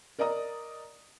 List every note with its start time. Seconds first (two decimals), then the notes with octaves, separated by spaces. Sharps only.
0.19 A#4 D5 D#5 A#5 D#6